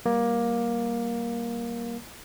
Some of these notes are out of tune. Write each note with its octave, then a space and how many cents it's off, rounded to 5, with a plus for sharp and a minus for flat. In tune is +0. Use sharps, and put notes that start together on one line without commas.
G3 +0 A#3 +15